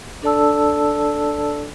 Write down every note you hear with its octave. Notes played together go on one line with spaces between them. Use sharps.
D4 A4 D5 A5 E6